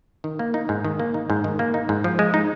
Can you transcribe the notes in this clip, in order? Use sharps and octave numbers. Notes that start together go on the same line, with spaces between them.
D#3
A#3
D#4
G#2
D#3
A#3
D#4
G#2
D#3
A#3
D#4
G#2
F3
G#3
D#4